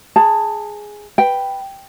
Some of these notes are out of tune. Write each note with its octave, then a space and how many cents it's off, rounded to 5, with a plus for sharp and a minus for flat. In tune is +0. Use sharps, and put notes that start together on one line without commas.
G#4 +0 A5 +20
B4 +0 G5 +0